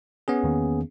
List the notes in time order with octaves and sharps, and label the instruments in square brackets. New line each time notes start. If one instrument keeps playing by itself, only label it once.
[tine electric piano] B3 C#4 G#4
[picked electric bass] E2 D#3 A#3